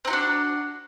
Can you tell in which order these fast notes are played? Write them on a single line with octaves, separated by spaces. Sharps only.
C4 D#4 F#4 D4